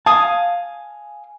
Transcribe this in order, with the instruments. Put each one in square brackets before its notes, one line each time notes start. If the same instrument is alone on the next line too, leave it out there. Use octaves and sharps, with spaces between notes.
[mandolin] F5 G#5 D#6 [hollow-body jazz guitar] A5